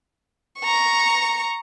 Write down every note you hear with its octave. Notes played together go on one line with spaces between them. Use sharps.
A#5 C#6